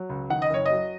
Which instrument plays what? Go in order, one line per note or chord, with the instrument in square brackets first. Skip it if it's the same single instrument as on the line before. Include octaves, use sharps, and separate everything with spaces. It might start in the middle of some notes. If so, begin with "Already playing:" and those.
Already playing: [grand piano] F#3
C#2
D#3 F#5
D#5
F#1 C#5
D#5
F#3